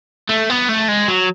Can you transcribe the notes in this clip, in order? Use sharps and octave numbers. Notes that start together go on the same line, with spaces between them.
A3
B3
A3
G#3
F#3